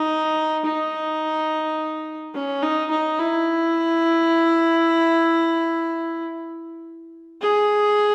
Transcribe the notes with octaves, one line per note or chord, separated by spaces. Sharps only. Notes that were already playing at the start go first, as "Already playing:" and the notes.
Already playing: D#4
D#4
C#4
D#4
D#4
E4
G#4